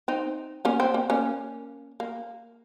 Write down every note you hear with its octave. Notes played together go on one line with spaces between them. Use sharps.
C4 D#4
A#3 C#4
C4
A#3
A#3 C#4
A#3